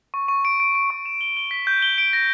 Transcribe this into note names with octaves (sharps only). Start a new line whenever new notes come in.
C#6
C#6
D7
D7
D7
C#6
E7
G7
G7
B6
G6
G7
D7
A#6